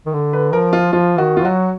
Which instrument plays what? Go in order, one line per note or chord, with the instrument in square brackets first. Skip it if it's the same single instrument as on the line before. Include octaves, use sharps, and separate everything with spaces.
[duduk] D#3
D3
[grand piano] B4
[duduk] F3 [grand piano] A#4
[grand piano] F4
[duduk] F3 [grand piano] F4
[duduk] D#3 [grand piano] F#4
[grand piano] F4
[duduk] F#3 [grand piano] F#4